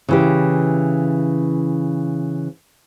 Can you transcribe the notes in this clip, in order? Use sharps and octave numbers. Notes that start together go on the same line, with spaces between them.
C#3 E3 G4